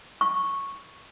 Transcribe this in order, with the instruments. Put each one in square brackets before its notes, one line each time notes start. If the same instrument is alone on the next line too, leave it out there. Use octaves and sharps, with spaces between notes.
[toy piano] C#6